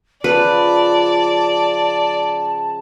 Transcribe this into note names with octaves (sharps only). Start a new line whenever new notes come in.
C#3 F3 B4 D5 A5